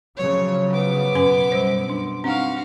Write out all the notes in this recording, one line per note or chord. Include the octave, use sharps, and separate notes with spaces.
C#3 F3 F#3 C#5
B3 D6
F#2 B2 C#4 B4 G#5
G3 B4 C5
D4
C4 D4 D#4 F#4 F5